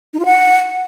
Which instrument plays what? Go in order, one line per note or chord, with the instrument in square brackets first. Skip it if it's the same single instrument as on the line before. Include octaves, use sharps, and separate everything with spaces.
[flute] D#4
F4
F#5